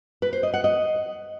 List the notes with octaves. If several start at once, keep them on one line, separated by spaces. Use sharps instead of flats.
B4
C5
D#5
F#5
D#5